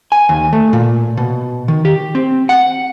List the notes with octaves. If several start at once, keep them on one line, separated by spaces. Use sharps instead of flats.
G#5
D#2
A3
A#2
B2
D#3
G4
C4
F#5